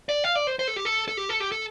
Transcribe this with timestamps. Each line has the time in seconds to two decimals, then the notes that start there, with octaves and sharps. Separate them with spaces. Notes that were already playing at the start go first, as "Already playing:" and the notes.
0.09 D5
0.24 F5
0.35 D5
0.47 C5
0.59 C5
0.68 A4
0.76 G4
0.85 A4
1.08 A4
1.17 G4
1.29 A4
1.40 G4
1.52 A4